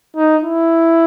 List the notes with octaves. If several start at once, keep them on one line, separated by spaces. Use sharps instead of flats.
D#4
E4